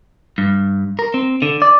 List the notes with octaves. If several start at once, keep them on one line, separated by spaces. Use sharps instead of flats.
G2
A#4
C4
D3
D5